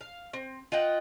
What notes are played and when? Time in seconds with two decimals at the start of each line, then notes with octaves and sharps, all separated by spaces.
0.01 F5
0.33 C4
0.72 F4 D#5 F#5 G5